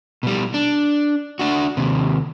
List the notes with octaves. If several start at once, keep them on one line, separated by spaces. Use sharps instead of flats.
B2 G3
D4
D4 F#4
D#2 C3